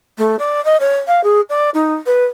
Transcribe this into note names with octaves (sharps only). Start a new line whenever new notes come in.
A3
D5
D#5
C#5
F5
G#4
D5
D#4
B4